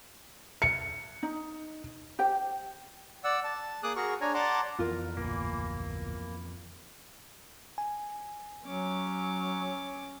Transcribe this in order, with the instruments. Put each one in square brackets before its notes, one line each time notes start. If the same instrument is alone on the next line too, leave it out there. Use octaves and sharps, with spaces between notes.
[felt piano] C#7
[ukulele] D#4
G4 C5 G5
[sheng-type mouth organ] D5 F#5 E6
A5
A#3 G#4 D6 D#6 F#6
F#4 G#4 A#4 C#6
D4 C#5 G#5 A#5
D5 F#5 A5 A#5 C6 D6
[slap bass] F2 B3 [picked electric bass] E3 [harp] F4 A#4
[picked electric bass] A1 D2 A#2 [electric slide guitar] E3 A#3
[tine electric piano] G#5
[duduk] F#3 [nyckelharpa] C#4 D6